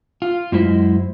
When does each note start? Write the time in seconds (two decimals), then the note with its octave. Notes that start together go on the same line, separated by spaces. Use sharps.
0.22 F4
0.52 F#2 G#3 E4 C5 D#5 E5